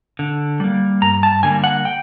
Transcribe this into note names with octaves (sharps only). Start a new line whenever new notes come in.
D3
G3 A#3
G2 A#5
A5
D3 G3 A#3 G#5
F#5
G5